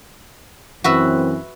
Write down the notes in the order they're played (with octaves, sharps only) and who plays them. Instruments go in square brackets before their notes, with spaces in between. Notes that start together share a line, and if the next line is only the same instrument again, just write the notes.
[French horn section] F#2 E3 C4 [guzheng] F#4 B4 E5